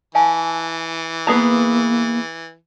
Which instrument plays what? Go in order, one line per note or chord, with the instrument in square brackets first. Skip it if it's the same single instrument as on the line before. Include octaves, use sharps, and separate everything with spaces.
[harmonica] E3 [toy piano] F5 G#5 A5
[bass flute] A#3 [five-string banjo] B3 G#4 A#5